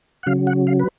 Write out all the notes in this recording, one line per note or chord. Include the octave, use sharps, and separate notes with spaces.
F#5
C#3 F#3 F5
F#5
F5
B4